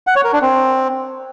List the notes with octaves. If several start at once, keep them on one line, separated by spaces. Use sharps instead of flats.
F#5
C#5
A#4
D4
C4